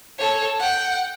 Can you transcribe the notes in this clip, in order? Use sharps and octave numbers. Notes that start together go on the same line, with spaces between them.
A4 C#5
F#5 G5